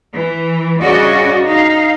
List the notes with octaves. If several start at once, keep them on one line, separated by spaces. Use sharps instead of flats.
E3
G2 C#3 C#4 F#4 D5 D#5
D#4 F5